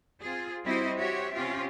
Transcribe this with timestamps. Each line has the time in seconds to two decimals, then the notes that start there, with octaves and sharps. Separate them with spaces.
0.22 C4 F4 G#4
0.63 G3 C4 E4 F#4 C5 D#5
0.98 F#4 G4 C5 C#5 E5
1.34 C3 C4 C#4 F4 G4